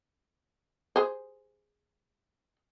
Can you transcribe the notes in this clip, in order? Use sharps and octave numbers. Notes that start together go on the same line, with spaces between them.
G#4 C5